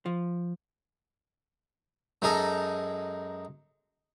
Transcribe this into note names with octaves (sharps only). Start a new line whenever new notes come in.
F3
F#2 G#3 D#4 A4